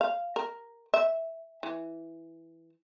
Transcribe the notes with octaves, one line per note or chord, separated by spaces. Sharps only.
F5
A#4
E5
E3